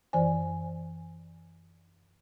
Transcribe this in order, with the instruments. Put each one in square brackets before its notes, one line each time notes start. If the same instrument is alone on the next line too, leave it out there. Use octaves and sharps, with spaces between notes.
[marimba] F#2 E3 C5 D5 G#5